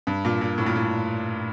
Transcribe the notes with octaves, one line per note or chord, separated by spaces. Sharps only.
G2
A#2
A#2
A2
A#2
A2